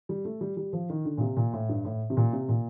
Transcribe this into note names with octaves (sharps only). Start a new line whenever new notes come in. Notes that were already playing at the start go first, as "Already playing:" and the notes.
G3
A3
G3
G3
F3
D#3
D3
A#2
C3
A#2
A2
G2
A2
C3
A#2
C3
A#2